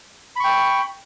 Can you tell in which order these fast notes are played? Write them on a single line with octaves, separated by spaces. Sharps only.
B5 C#6 G5